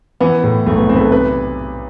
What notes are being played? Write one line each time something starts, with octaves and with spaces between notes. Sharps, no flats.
E3 B3
A2
B1 A3
B3
B1 C4
B4
A4
C3 B4